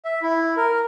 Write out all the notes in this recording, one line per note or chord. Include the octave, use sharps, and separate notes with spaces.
E5
E4
A#4